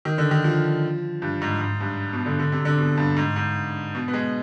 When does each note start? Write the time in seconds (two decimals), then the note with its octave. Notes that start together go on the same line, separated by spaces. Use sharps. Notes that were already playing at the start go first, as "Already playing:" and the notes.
0.05 D#3
0.18 D3
0.31 D#3
0.44 F3
1.22 G2
1.42 G#2
1.61 G#2
1.80 G2
2.13 B2
2.26 D3
2.39 D3
2.52 C3
2.65 D3
2.78 B2
2.97 G2
3.17 G#2
3.36 G#2
3.95 B2
4.08 B3
4.14 G#3